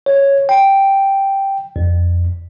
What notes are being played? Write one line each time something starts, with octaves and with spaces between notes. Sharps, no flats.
C#5
G5
F2